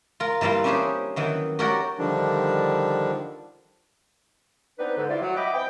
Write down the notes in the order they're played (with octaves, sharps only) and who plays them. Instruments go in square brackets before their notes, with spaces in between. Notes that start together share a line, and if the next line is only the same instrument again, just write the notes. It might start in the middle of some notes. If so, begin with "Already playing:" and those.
[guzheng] F4 A#4
E3 G3 A#3 E4 F4
C#4 D4 E4 G4 G#4 C5
D#3 E3 F#3
F#4 G4 A#4 C#5 D5 F#5
[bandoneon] D3 D#3 F3 G3 D4
[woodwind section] B3 C4 D4 D#4 B4
G#2 D3
E4 F4 D5
F#3
D#5 E5 F#5 G5 B5 D6
E3 C4 E4 G5